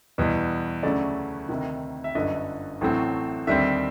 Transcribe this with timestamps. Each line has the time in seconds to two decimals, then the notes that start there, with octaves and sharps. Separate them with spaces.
0.18 E2 B2 G3
0.83 D2 C#3 F#3 A3 D5
1.49 D2 C3 D#3
2.04 E5
2.15 G1 F#2 D3 D#5
2.81 A1 A2 F#3 A3 C4
3.47 D#2 D3 G3 C4 E5